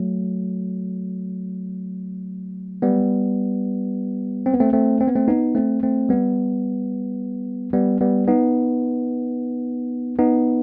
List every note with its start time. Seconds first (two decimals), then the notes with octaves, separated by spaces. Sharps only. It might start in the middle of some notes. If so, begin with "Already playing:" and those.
Already playing: F#3 A3
2.82 G3 B3
4.46 C4
4.53 B3
4.60 A3 C4
4.73 A3 C4
5.01 C4
5.08 B3
5.15 A3 C4
5.28 B3 D#4
5.55 A3 C4
5.83 A3 C4
6.09 G3 B3
7.73 G3 B3
8.01 G3 B3
8.27 B3 D#4
10.19 B3 D#4